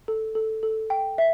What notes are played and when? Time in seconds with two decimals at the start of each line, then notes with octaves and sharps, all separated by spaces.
0.08 A4
0.35 A4
0.63 A4
0.90 G5
1.18 E5